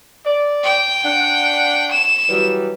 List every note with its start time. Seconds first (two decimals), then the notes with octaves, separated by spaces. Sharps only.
0.26 D5
0.64 G5
1.04 D4 F#5
1.92 E7
2.29 E3 F#3 G3